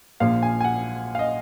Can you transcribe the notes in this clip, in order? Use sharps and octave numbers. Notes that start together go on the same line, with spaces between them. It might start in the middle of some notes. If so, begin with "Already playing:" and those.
A#1 A#2 F3 F5
G#5
G#5
F#5
F5
D#5